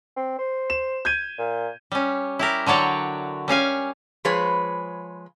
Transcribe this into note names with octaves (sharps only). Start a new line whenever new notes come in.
C4
C5
E7
G6 G#6 D#7
A#2
G3 C#4
E4 G4 A#4
D3 F#3 C#5 D5 G5
G3 C#4 F5 G#5
F3 G#3 G#4 B4 C#5